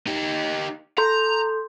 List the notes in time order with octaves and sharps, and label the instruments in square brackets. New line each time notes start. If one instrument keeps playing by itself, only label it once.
[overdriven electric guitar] D#4 G4
[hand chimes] A4 C6 G6 [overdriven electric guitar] A#5